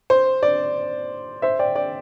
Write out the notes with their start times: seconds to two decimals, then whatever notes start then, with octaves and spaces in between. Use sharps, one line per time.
0.10 C5
0.43 D5
1.42 C5 E5
1.59 D5 G5
1.75 D5